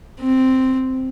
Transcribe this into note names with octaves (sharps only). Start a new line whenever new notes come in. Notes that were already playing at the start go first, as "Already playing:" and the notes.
C4